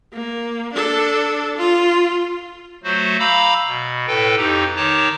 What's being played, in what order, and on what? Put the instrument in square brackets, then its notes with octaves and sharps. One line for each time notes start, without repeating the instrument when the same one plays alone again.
[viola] A#3
D4 A4
F4
[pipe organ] F#3 A3 F#4 C5
F5 A#5 B5 D6 E6
B2
A2 A4 B4 G5
F2 D#4 G4
D#3 D#4 C#5 A5 D6